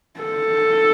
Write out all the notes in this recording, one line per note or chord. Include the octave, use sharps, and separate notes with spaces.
A4